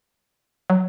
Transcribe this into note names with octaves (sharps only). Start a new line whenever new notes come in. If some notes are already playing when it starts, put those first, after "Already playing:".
F#3